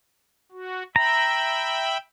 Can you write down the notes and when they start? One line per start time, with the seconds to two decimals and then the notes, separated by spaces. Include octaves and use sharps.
0.52 F#4
0.96 E5 G5 A#5 B5